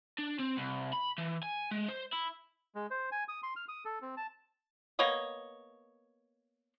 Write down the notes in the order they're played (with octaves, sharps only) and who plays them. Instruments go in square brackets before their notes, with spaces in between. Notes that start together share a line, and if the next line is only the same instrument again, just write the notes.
[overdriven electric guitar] D4
C4
C2
B5
E3
G#5
G#3
C5
E4
[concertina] G#3
C5
G#5
D#6
C6
F6
D#6
A4
C4
A5
[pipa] A#3 B3 C#5 D#5